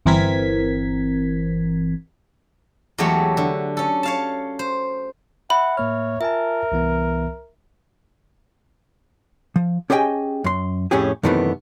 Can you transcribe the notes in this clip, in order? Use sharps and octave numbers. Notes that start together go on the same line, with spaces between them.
G1 E3 C4 A#4 G#6 B6
E2 F#3 G#3 A3 G4 C#5
D3
C#4 A4
C#5 F5 A5
C5
E5 F#5 B5
A2 A#3 C#5 F6
F4 A#4 E5 G#5 A5
C2 E3 B3
F3
C#4 G4 G#4 D#5 G5 G#5
F#2 C6
F2 A2 C#4 G4 G#4
F#2 C3 D#3 E3 A3 B3